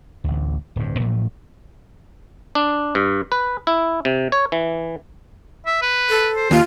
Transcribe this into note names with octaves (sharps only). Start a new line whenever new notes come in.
A1 D2
D1 G2
A2 F3 F#3 A3
D4
G2
B4
E4
C3
C#5
E3
E5
B4
A4
C5
D#2 F4